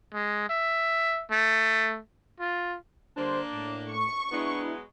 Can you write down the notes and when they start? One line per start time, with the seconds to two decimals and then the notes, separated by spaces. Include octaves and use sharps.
0.13 G#3
0.49 E5
1.31 A3
2.40 F4
3.17 D3 G3 A#3 D4 C5
3.52 A2
3.90 C#6
4.32 F#3 G#3 B3 D4 E4